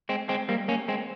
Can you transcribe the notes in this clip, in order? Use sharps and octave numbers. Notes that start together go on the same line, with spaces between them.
G#3 C4
G#3 C4
G3 A#3
A#3 C#4
G#3 C4